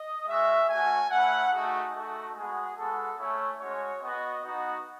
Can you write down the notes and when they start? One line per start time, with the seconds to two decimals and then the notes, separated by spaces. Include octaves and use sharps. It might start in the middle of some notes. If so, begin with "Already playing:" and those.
Already playing: D#5
0.27 G#3 C#4 F#4 E5
0.69 A3 C#4 F#4 G#5
1.10 A3 C#4 E4 F#5
1.52 A3 D#4 F#4 G#4
1.93 A3 D#4 F#4 A4
2.34 G#3 B3 F#4 G#4
2.76 G#3 B3 F#4 A4
3.18 A3 C#4 E4 C#5
3.59 G#3 C#4 F#4 C#5
4.01 B3 F#4 D#5
4.42 B3 D#4 F#4